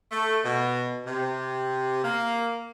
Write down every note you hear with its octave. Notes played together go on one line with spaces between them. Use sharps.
A3
B2
C3
A#3